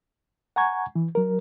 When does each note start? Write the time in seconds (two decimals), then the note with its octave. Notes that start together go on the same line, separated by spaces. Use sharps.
0.56 F#5 G#5 A#5 C#6 G#6
0.95 E3
1.15 F#3 A#4